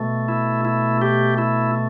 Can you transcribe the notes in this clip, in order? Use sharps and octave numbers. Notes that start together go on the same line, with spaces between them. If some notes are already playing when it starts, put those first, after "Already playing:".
Already playing: B2 A3
E4
E4
G4
E4